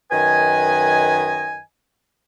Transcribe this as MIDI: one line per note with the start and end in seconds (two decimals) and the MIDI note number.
0.11 1.60 42
0.11 1.60 51
0.11 1.60 71
0.11 1.60 75
0.11 1.60 80